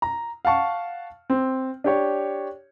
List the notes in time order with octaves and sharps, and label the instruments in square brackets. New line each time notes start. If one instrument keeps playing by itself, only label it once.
[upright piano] A#5
F5 F#5 A5 C#6
C4
D4 G4 C#5